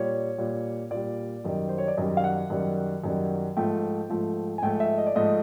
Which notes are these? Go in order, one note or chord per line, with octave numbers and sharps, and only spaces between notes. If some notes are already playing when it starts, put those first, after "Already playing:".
Already playing: A#2 G3 C#5
A#2 G3
A#2 G3 D5
F#2 D#3 G3
C5
C#5
D5
F#2 D#3 G3 D#5
F5
F#5
F#2 D#3 G3
F#2 D#3 G3
G#2 F3 A3 G5
G#2 F3 A3
G#5
G#2 F3 A3 G5
E5
D#5
D5
G#2 F3 A3 D#5